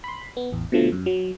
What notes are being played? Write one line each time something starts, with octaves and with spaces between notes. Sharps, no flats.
B5 C6
B3
A1 E2
B2 D3 F3 A3
F#2
F#3